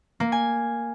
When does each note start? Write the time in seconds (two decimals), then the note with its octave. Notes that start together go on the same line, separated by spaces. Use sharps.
0.20 A#3
0.32 G#5